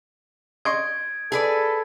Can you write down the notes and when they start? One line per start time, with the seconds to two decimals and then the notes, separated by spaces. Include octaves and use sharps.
0.65 D#5 C6 C#6 G#6 D7
1.32 G#4 A4 B4 D5